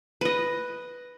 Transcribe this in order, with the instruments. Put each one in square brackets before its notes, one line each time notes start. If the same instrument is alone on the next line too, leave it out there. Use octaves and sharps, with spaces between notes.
[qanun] B4 D#5